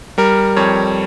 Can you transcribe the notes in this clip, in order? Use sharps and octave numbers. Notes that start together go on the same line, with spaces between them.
G3 A#4
F2 C#5